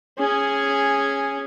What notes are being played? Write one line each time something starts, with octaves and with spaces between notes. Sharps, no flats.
C#4 G#4